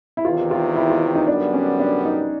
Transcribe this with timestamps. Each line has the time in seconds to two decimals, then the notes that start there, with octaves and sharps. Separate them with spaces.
0.17 E4
0.25 E2 C3 D#3 F4
0.51 F4
0.76 E4
0.90 F4
1.15 D#4
1.28 F#2 D3 G3 B3 D4
1.54 C#4
1.80 D4
2.05 D#4